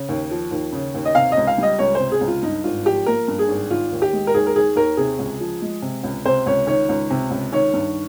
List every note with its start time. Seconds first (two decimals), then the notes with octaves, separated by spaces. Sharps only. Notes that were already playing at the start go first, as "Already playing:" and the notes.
Already playing: C#3
0.09 D#2
0.31 F3
0.51 D#2
0.72 C#3
0.95 D#2
1.05 D#5
1.15 C3 F5
1.32 D#5
1.37 C#2
1.47 F5
1.58 G3 D#5
1.79 C#2 C#5
1.95 C3 C5
2.12 G#4
2.21 C#2
2.28 F4
2.42 G2 D#4
2.64 G#1 F4
2.85 F3 G4
3.06 A#3 A#4
3.28 G2
3.39 G#4
3.48 G#1
3.70 D#3 F4
3.92 D#2
4.02 G4
4.13 G#3
4.27 A#4
4.34 D#2 G#4
4.47 A#4
4.56 D#3 G#4
4.76 D#2 A#4
4.97 C3 G#4
5.19 C#2
5.40 F3
5.62 G#3
5.82 C3
6.04 C#2
6.25 C3 C5
6.46 C#2 C#5
6.67 D#3 C#5
6.89 C#2
7.10 C3
7.31 C#2
7.52 D#3 C#5
7.74 G2